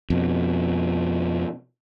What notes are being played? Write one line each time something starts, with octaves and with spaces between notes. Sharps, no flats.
F2 B2